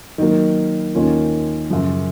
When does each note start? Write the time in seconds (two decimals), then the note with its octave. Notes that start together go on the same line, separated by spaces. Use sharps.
0.18 D#3 F#3 A#3
0.95 D#2 D#3 A#3 C#4 F4
1.70 F#2 C#3 F3